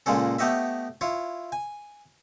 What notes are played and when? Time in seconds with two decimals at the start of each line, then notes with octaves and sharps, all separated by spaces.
0.06 C#2 A#2 G#3 C#4 A4
0.39 A3 B3 G4 C#5 D#5 E5
1.01 E4 F4 C#5
1.52 G#5